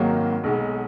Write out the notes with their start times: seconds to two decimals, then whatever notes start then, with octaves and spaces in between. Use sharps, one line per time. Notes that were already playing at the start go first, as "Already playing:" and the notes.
Already playing: G#1 G#2 D#3 F#3 A#3
0.44 B1 B2 G#3